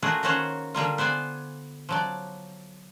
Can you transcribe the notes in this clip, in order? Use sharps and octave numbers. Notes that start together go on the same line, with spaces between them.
A3 F4 F#4 G#4 A#4 D5
D#3 A#3 C#4 F#4 C5 C#5
D3 G3 A#3 F4
B3 C5 D5 G#5
F3 F#3 D5